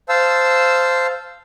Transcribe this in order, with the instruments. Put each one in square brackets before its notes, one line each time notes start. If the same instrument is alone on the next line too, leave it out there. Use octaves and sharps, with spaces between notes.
[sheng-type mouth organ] C5 F5 A5 E6